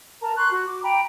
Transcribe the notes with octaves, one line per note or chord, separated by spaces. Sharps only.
A#4 A5 A#5
C6 C#6 F#6
F#4
D6
G5 A#5 B5